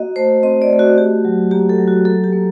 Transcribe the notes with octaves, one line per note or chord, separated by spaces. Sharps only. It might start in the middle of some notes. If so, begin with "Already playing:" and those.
Already playing: A#3 F#4 D#5
A3 C5
C4 D#5
D5
A3
F#4
F#4 G4
F#3
A#3 G4
A4
F#3
F#4
A#3 A4
G4
A#3